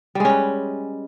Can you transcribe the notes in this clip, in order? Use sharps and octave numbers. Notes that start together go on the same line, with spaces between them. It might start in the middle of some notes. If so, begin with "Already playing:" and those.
G3 G#3 C#4 B4